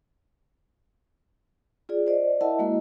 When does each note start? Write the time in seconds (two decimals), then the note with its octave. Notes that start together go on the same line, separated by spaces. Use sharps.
1.89 F4 G#4 D5
2.07 C5 D5 D#5
2.41 E4 A#4 D#5 E5 F#5 A5
2.59 G#3 A#3 E4 F#4 D#5